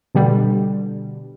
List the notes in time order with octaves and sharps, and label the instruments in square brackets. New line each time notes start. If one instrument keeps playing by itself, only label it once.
[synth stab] B2 D3 G3